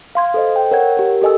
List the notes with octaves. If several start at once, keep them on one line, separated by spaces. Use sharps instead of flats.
F5 C6 G#6
A4 C5 D#5
G5
A#4 C#5 F#5 G#6
G4 A#4
G4 A4 D#5 G#5 E6